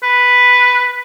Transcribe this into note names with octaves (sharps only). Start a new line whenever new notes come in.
B4